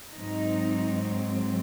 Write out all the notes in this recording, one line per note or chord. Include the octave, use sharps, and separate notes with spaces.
G#2 F#3 C4 D#4